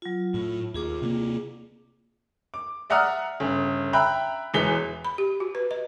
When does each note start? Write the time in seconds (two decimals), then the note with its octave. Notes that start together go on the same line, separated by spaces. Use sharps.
0.02 F#3 F4
0.34 A2 F4
0.74 D#2 F4 G#4 D6
1.02 C3 G#3 A#3
2.54 D6
2.90 D5 E5 F#5 A#5 D#6 F6
3.40 G1 C#3
3.93 E5 G5 A#5 B5 F#6
4.54 E1 E3 G#3 B6 G7
5.05 B5
5.18 G4
5.40 F#4
5.55 B4
5.71 D#5